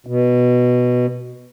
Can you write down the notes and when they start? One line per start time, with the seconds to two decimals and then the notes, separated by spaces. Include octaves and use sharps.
0.07 B2